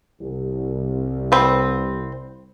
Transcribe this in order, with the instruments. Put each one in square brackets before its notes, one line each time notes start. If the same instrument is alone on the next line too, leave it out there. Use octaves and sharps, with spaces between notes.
[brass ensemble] C2
[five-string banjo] C4 B4